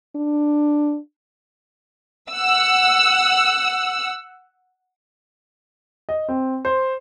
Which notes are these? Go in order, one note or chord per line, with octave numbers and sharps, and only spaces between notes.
D4
F#5 E6
D#5
C4
C5